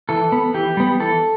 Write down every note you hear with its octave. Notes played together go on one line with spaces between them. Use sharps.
E3 A4
B3
E3 G4
G3 B3
E3 A4